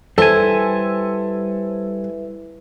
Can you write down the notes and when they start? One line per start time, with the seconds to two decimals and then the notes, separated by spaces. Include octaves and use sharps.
0.18 G3 E4 A4 B4 C5 E5 G#5